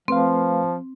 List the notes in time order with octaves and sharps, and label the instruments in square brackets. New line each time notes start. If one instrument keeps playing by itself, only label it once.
[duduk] F3 [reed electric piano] A3 B4 F5 [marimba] C4